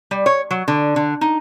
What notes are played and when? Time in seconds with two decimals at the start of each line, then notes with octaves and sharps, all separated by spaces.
0.11 G3
0.26 C#5
0.51 F#3
0.68 D3
0.96 D3
1.21 D#4